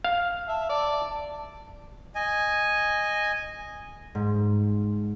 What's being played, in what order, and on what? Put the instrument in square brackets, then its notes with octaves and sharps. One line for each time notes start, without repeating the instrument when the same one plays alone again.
[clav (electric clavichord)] F5
[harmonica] E5 [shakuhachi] A5
[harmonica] D5 [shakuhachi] A5
[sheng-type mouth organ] D#5 G#5
[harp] G#2